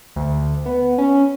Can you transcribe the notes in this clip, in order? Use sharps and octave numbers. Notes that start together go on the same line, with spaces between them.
D2
B3
C#4